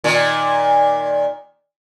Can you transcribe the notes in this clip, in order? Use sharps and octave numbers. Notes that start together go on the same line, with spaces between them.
A#2 D#3